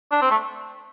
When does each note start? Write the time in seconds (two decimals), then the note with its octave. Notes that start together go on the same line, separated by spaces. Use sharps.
0.11 D4
0.22 C4
0.31 A3